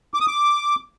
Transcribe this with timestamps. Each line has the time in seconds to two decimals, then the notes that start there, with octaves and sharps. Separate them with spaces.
0.14 D6
0.21 D#6
0.27 D6